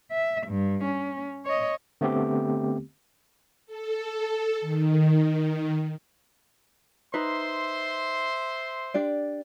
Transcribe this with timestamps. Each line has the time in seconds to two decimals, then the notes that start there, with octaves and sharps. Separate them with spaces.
0.12 E5
0.47 G2
0.84 C#4
1.45 C#5 D#5
2.01 D3 A3 B3 C4 G4
3.66 A4
4.61 D#3
7.14 D#4 B4 C5 E5 C6
8.94 D4 G4 D5